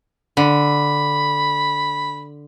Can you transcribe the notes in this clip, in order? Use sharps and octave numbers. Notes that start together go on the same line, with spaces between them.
D3 B5